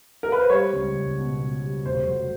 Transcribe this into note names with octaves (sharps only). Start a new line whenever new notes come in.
A#4
B4
C5
G3 C#5
C#2
C#2
B2
B2
G3
F1 C5
F#3